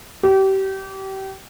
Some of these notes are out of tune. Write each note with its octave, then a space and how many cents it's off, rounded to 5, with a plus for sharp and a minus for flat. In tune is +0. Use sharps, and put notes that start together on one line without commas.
G4 -30